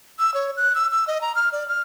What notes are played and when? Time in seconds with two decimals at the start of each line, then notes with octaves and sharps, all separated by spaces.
0.19 E6
0.34 C#5
0.57 F#6
0.75 E6
0.92 E6
1.07 D#5
1.21 A#5
1.35 F6
1.52 D5
1.68 F6